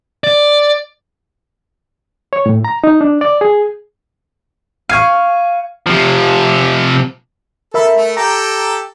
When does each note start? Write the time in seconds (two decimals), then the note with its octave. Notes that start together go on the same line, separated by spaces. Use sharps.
0.24 D5
2.33 C#5
2.46 A2
2.65 A#5
2.84 D#4
3.01 D4
3.21 D5
3.41 G#4
4.90 F5 C#6 G#6 D#7
5.87 C3 F3
7.74 A4 A#4 E5 B5
7.96 A3
8.17 G4 A4 G5 A#5